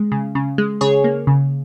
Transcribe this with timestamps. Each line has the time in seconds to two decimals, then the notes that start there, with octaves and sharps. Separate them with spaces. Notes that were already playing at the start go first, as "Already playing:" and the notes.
Already playing: G#3
0.12 C#3
0.35 C#3
0.58 G#3
0.81 C#3 G#4 C#5
1.04 A#3
1.27 C#3